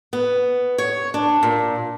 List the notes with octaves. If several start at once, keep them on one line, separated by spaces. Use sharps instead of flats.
B3
C#5
D4
A#2